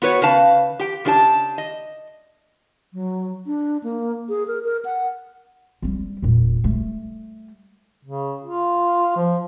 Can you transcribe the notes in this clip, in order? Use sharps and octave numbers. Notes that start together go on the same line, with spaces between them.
B3 F#4 B4 C#5
C#3 B4 F5 A5
G4 G5
C#3 D4 G4 D5 A5
D#5
F#3
D4
A#3
G#4
A#4
A#4
F#5
G3 C4
E1 A#2
G3 A3
C#3
F4
F3